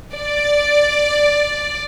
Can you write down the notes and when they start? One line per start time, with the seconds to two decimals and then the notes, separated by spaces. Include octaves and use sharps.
0.14 D5